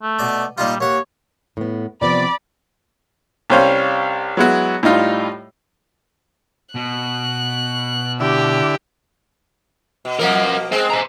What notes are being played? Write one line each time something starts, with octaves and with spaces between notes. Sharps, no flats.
A3
B2 D5
A#2 G3 D#4 F4
D#2 C#5 F#5
A2 B3
C3 F3 B3 D5 B5
C2 G3 C#4 C5 C#5 F5
F#3 G#3 B3 E4 F#4
A2 G3 D#4 F4
B2 F#6
D3 E4 G4
B2
B2 F3 A#3 A#4 F#5
G#3 C4 C5 G5
C5 A#5